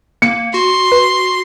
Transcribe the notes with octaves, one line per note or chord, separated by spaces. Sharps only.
A#3 C#7
F#4 C6
B4